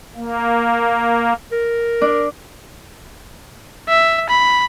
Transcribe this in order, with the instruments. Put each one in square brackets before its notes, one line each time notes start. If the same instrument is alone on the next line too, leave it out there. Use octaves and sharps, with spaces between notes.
[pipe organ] A#3
[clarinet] A#4
[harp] D4
[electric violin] E5
B5